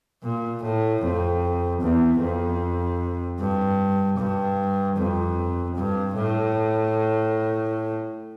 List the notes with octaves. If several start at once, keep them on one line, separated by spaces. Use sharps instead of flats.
A#2
A2
F2
E2
F2
G2
G2
F2
G2
A2